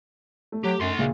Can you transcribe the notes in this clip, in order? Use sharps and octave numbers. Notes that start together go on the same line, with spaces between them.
A3
F#3 G4
F#2 F#4 C6
A#1 A#2 C#3